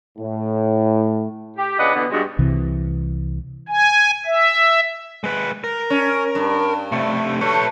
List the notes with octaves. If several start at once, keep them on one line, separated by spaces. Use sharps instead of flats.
A2
G4
A#2 C#3 D4 B4 D#5 F#5
B2 D3 E3 B3
G2 G#3 F#4
C2 C3 E3
G#5
E5
G#3 B4
A#4
C#4
G2
C3 A3
A3 B4 C#5